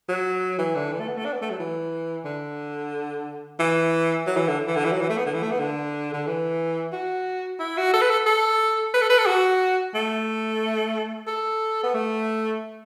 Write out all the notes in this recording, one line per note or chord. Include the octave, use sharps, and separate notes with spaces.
F#3
E3
D3
E3
A3
B3
A3
D4
B3
A3
F#3
E3
D3
E3
F#3
E3
D3
E3
D3
E3
F#3
E3
A3
B3
D3
E3
A3
B3
D3
D3
E3
F#4
E4
F#4
A4
B4
A4
A4
B4
A4
B4
A4
F#4
A3
A4
B3
A3